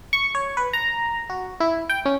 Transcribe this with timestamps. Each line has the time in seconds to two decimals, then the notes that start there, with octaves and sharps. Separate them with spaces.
0.13 C#6
0.35 C#5
0.57 B4
0.73 A#5
1.30 F#4
1.60 E4
1.89 G5
2.06 C#4